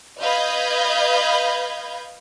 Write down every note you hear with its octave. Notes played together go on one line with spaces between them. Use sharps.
B4 D#5 F5 B5 G6 G#6